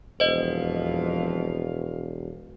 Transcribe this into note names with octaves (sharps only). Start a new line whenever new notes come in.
E1 F2 C5 D#5 F5